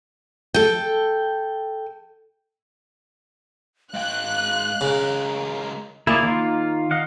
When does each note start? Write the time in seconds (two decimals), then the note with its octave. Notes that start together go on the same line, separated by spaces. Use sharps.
0.54 A4 G5
3.94 G#2 F5 G5 F#6
4.81 C#2 C#3 A#4
6.07 A#3 E4 G#4 D5
6.23 D#3 F4
6.91 D#5 F5 F#5